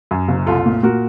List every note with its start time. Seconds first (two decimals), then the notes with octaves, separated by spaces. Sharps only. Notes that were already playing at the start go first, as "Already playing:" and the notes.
0.11 F#2
0.28 F#1
0.47 C2 F4 A4
0.66 A#2
0.83 A#2 F#4 A#4